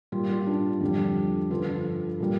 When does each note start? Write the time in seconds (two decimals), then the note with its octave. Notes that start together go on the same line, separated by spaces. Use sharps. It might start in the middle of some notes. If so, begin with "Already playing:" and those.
0.12 A#2 G3 F4
0.29 F4
0.47 D4
0.81 F2 D3 G3
1.50 G2 D3 F3 F4
2.20 A#2 G3